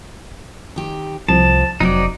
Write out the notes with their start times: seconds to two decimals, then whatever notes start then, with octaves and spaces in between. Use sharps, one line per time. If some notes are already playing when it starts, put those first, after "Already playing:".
0.76 D#3 G4
1.29 C2 F3 A5
1.80 F1 F#3 C4 D#4 F#4 D5